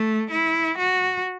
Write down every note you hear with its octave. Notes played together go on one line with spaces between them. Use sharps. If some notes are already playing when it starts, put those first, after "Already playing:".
Already playing: A3
E4
F#4